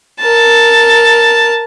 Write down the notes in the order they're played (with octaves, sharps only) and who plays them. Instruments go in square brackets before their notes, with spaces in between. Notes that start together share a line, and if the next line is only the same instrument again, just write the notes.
[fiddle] A#4 A5